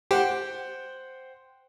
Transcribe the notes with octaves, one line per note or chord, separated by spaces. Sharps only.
G4 C5 F#5 G5